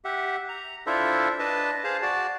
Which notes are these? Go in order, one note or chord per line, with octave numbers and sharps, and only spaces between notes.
G4 E5 F#5
A#5
D4 E4 F4 A4 C5 E5
D4 B4 D#5 A5
G#4 C5 F5 A5
F#4 D5 A5